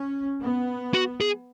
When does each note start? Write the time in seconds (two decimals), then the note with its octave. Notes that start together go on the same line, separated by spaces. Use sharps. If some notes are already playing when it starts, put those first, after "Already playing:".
Already playing: C#4
0.41 B3
0.94 F#4
1.21 G#4